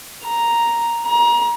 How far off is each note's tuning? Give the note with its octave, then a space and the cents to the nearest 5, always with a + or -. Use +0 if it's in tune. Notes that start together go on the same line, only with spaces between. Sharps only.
A#5 +0
A#5 +30